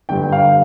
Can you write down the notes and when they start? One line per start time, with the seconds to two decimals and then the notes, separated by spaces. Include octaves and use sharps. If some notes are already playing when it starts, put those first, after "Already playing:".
0.09 G2 D3 G3 G5
0.32 F5